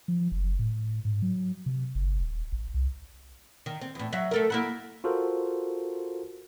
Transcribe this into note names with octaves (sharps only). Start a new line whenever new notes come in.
F3
F#1
A2
G#2
F#3
C3
G1
D#1
A1
C2
D#3
C4
E2 A2
F#3 E5
A3 A4 A#4
A#3 E4 F#4
F4 F#4 A4 A#4 C5